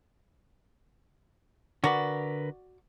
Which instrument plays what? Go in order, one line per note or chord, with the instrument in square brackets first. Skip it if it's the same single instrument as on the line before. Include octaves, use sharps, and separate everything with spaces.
[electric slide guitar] D3 A#4 B4 [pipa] F#4 D5